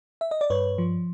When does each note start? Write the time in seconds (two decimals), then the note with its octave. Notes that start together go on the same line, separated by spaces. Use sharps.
0.21 E5
0.31 D#5
0.41 D5
0.50 G2 B4 C#5
0.78 F3